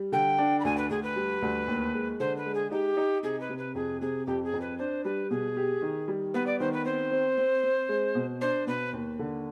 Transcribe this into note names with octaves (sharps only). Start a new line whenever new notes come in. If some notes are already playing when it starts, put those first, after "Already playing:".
Already playing: G3
D3 G5
D4
B5
D2 G#5
B4
D2 G#4
B4
G3
D2
D#2
G#3
D3 C5
B4
G#3
G#4
D#4 G4
D#4
C3 G#4
B4
C3
B4
F2 G#4
C3 G#4
F2 G4
G#4
F2
B4
D4 C5
G3 B4
B2 G#4
G4
D#3
G3
B3 B4
D5
D#3 C5
B4
C4 C5
C4
C4
C4
G#3
B2
D4 C5
B2 B4
D#2
D3